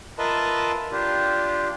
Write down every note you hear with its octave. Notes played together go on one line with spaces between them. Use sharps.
F4 A#4 B4 D#5 E5 A5
D4 F4 G4